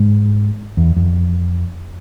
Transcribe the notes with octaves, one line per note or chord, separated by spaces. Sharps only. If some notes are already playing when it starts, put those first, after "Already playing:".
Already playing: G#2
E2
F2